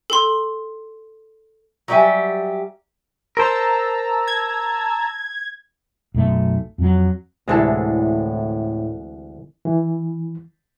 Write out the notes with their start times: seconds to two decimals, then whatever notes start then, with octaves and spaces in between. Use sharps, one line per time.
0.10 A4 C6
1.88 F#3 G3 G4 C5 E5 G#5
3.37 A#4 C5 A5 A#5 E6
4.28 G#6
6.14 B1 F#2 A3
6.78 F2 F#3
7.48 D2 A2 C3 E3 G#3 D4 A4
9.65 E3